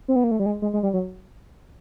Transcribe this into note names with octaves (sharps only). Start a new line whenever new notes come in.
C4
B3
A#3
A3
G3
G#3
G#3
G#3
G3
F#3